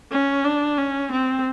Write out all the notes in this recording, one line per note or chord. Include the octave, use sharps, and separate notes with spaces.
C#4
D4
C#4
C4